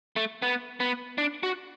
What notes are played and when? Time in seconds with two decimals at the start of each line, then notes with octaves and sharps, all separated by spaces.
0.16 A3
0.42 B3
0.80 B3
1.18 D4
1.43 F#4